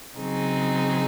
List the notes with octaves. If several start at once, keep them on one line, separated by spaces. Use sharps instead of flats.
C#3 F#3 C4 D#4 G#4